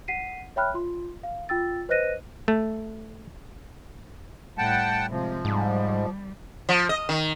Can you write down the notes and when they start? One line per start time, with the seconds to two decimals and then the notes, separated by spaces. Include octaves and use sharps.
0.08 F#5 B6 C7 D#7
0.56 C#5 E5 G5 B5 F6 F#6
0.74 F4 C6
1.23 F5
1.49 F4 G5 E6 A6
1.89 B4 C5 D#5 F#6 A#6 D#7
2.48 A3
4.58 A2 G3 F#5 G5 A5
5.10 C3 F3 G#3
5.45 G#2 G3
6.69 F3
6.89 D#5
7.09 D#3